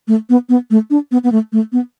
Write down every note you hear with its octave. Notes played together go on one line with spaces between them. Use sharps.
A3
B3
B3
A3
D4
B3
B3
A3
A3
B3